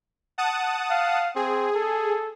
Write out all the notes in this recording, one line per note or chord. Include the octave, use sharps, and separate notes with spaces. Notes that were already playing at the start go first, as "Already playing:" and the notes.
F#5 A5 D#6
F5
C4 G#4
A4